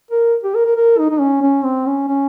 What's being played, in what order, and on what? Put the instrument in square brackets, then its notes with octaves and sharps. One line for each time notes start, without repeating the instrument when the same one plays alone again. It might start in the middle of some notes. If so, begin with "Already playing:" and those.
[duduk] A#4
G4
A#4
A#4
A#4
D#4
D#4
C#4
C#4
C4
C#4
C#4